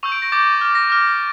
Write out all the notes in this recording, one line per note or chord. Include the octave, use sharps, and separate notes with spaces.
C#6 E6 G6 F7
D7
A#6
D6 G6 A6
D6 F6
A#6
D6 F6